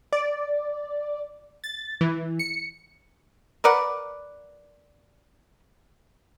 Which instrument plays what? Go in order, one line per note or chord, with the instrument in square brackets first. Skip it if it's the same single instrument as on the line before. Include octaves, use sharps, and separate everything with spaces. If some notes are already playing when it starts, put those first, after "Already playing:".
[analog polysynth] D5
A6
E3
C#7
[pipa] A#4 B4 D5 F#5